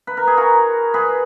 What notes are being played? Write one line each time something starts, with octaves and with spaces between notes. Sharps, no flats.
B4
A#4
G#4
F#4 A#4
G#4 B4